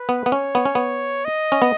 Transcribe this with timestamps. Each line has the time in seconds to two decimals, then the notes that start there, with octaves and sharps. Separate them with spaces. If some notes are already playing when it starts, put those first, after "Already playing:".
Already playing: B4
0.09 B3
0.26 B3
0.32 C#4 C#5
0.55 B3
0.65 C#4
0.75 B3
1.25 D#5
1.52 C#4
1.62 B3